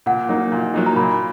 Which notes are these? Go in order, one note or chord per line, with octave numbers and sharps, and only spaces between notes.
A#2 F#5
F#3 A#3 D#4
A#2
F#3 A#3 D#4
A#5
A#2 B5